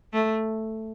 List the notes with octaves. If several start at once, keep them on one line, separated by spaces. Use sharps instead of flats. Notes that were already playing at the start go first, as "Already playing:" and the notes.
A3